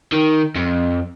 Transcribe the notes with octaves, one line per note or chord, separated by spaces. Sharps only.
D#3
F2